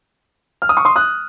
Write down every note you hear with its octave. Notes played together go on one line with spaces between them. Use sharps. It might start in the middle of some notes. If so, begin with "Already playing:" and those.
F6
D#6
C#6
C6 D#6
D#6 F#6